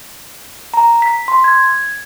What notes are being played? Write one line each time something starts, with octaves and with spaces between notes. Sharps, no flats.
A#5
B6
C6
G#6